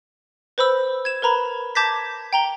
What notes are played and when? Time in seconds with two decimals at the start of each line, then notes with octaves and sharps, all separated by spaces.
0.58 B4 C5 B5 E6
1.05 G#6 E7
1.22 A#4 B4 A#5 B5
1.75 A5 D6 G6 G#6 A#6 B6
2.33 G5 A#5 G7